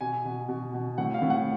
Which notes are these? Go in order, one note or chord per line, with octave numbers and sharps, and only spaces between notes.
B2 G#5
B2
B2
B2
A2 F#5
F5
A2
F#5